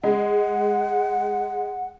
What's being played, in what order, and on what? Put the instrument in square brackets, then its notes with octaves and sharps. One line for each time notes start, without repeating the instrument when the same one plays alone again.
[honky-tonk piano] G#3 [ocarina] F#5